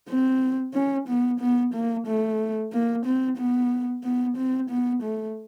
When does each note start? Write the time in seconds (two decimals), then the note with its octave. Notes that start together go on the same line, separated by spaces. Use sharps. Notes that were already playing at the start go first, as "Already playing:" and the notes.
0.09 C4
0.74 C#4
1.08 B3
1.40 B3
1.74 A#3
2.07 A3
2.72 A#3
3.05 C4
3.38 B3
4.04 B3
4.37 C4
4.70 B3
5.03 A3